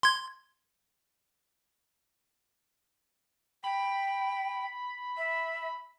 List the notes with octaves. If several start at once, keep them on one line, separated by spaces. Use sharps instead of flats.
C6 G#6
G5 B5
E5